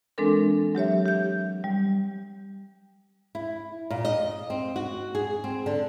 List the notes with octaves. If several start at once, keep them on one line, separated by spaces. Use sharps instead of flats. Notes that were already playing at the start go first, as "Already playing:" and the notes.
E3 G#3 C4 D4 A4 A#4
F#3 G4 C#5 E5
G4 G6
G3
E4
A#2
D#5
C4
F#4
G#4
C4
D3